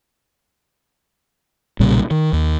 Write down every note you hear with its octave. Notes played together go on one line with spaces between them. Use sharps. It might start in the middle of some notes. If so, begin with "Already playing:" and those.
B1 A#2 C#3 G3
D#3
D#2